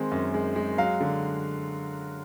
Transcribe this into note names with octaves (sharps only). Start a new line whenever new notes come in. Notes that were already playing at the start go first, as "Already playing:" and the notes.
Already playing: D#3 G#3 C4
F#2
G#3
G#3
F#3 F5
D3